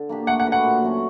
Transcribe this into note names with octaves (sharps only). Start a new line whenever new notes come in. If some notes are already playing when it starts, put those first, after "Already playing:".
Already playing: D3
A#3 D4 G4
A3 F#5
F#5
D4 F#4 B4
F#5
A#2
F#3 A3 C#4